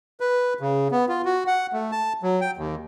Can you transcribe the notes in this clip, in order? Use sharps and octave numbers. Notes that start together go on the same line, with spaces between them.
B4
C#3
B3
F4
F#4
F#5
A3
A5
F#3
G5
D#2